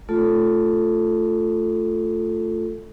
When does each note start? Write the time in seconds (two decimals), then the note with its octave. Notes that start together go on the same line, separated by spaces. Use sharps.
0.09 A3 F4 A4